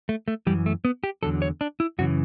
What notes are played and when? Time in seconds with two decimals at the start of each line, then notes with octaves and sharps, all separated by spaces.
0.09 A3
0.28 A3
0.47 F#2 E3 G3
0.66 A3
0.85 B3
1.04 G4
1.23 E2 D3 F#3 A4
1.42 C#5
1.61 D4
1.80 E4
1.98 F#2 C#3 E3 F#4